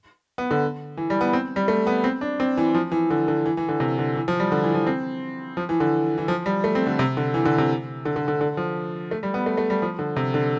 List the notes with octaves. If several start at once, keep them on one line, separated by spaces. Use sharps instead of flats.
B3
D3
E3
G3
B3
C4
G3
A3
B3
C4
D4
C4
E3
F3
E3
D3
D3
E3
E3
D3
C3
D3
E3
F3
G3
D3
E3
F3
C4
F3
E3
D3
E3
F3
G3
A3
C4
D3
C3
D3
E3
D3
C3
D3
D3
D3
D3
F3
A3
G3
B3
A3
A3
G3
F3
D3
C3
D3